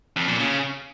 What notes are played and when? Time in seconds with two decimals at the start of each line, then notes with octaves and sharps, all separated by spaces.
0.16 F2
0.28 A#2
0.40 C#3